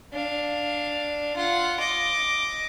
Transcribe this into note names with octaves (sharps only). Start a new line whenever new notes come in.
D4 F5
F4 F#5
D#5 D6